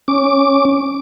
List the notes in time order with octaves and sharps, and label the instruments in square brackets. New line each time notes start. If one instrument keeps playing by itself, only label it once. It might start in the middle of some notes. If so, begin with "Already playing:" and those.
[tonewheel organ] C#4 D6